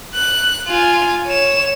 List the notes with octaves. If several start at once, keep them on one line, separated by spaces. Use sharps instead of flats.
F#6
F4 G#5
C#5 E7